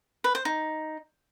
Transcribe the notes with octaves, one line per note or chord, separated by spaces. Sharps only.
B4
C5
D#4